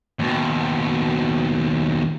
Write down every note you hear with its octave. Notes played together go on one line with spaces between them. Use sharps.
D#2 B2